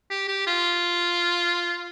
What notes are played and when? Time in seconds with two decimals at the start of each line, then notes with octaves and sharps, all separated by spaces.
0.11 G4
0.28 G4
0.47 F4